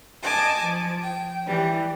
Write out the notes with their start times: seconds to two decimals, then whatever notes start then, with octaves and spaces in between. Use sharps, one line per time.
0.22 D#5 G#5 A5 D6
0.62 F3
1.02 G5
1.46 E3 G3